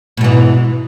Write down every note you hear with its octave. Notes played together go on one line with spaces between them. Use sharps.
G#2 B2 E3